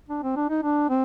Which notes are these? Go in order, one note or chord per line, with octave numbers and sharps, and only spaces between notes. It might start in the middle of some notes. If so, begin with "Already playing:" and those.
D4
C4
D4
D#4
D4
C4